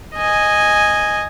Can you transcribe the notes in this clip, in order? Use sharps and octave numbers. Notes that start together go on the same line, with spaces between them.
D#5 G#5